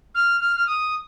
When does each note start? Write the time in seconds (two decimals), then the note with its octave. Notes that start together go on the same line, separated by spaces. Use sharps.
0.15 F6
0.41 F6
0.56 F6
0.67 D#6